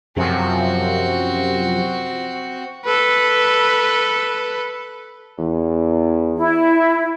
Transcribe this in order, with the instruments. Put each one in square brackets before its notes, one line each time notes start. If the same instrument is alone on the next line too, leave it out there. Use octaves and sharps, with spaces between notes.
[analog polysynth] F#2 C3 F3 [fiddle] C4 F#4
[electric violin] A4 B4
[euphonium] E2
[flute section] E4